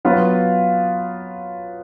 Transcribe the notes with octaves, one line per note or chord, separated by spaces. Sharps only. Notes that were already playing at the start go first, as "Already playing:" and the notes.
F#3 B3 F4